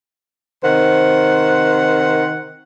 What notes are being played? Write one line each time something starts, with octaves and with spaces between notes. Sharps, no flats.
C3 D#3 C5 F#5